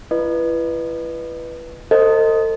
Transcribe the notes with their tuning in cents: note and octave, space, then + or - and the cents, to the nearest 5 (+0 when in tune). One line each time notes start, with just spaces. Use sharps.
E4 +40 B4 -5 D#5 -35
A4 +40 C5 +0 D#5 +5